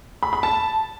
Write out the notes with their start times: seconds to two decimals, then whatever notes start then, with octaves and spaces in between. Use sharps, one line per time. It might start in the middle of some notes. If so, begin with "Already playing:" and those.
0.23 B5
0.33 B5
0.43 A5